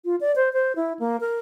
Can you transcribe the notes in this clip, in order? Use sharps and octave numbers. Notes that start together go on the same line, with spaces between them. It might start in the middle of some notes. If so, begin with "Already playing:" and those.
F4
D5
C5
C5
E4
A#3
A#4